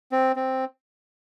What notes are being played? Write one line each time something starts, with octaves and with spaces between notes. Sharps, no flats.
C4
C4